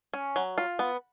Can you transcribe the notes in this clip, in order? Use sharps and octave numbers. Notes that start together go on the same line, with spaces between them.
C#4
F#3
F4
B3